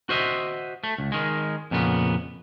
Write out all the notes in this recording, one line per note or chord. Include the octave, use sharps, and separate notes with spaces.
F#4 C5 D#5 E5
A3
C#2
D#3 G#3
F2 A#2 C#3 B3